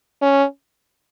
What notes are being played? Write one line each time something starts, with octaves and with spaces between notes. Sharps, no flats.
C#4